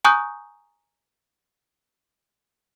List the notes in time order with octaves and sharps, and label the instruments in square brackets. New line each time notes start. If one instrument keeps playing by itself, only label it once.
[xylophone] G#5 A#5 C#6 D#6 F#6 G6